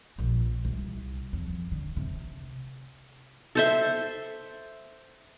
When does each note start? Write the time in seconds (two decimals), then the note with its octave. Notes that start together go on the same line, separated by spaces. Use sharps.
0.18 A#1 F3
0.65 C2
1.33 F2
1.72 D3
1.97 C3
3.55 A4 C5 E5